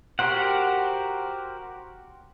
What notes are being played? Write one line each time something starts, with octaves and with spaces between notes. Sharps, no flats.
F#4 G4 A#4 C5 F#5